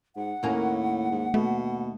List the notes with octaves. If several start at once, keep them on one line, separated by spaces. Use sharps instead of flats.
G#2 F#5
D#2 A2 A#3 C#4
G#2
B2 A3